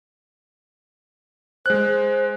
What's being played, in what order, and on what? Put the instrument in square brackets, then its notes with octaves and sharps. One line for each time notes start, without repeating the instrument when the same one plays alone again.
[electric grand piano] G#3 F#6 [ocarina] C5